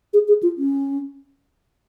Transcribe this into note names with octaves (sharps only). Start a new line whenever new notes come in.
G#4
G#4
F4
C#4